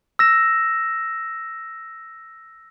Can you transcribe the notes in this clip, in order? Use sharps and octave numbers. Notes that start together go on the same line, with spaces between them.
E6 A#6 E7